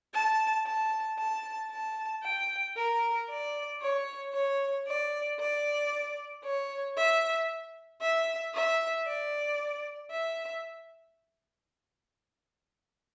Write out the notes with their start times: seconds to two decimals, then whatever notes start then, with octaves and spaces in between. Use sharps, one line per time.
0.14 A5
0.66 A5
1.19 A5
1.71 A5
2.24 G5
2.76 A#4
3.29 D5
3.82 C#5
4.34 C#5
4.87 D5
5.40 D5
6.45 C#5
6.97 E5
8.02 E5
8.55 E5
9.07 D5
10.12 E5